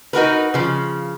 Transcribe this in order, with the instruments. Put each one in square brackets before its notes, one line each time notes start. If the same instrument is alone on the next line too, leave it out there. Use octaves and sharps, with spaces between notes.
[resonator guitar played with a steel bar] D#4 F#4 A#4 B4
C#3 F3